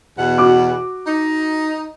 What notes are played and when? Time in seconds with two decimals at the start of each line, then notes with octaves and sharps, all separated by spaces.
0.19 E2 B2 F#5
0.38 F#4 D6
1.07 D#4